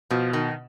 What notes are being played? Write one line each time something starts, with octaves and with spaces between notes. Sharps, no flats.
B2 F3
D#3